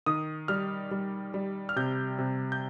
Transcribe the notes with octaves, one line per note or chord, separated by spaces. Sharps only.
D#3 D#6
G3 F6
G3
G3
F6
C3 G6
C3
G6